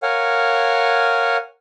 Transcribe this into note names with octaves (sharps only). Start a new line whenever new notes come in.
A#4 C#5 F5 F#5 G#5